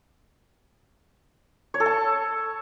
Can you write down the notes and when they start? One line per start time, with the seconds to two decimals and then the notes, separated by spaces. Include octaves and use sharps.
1.74 C#5
1.80 A4
1.86 A5